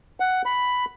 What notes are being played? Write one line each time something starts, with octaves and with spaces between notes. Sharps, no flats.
F#5
B5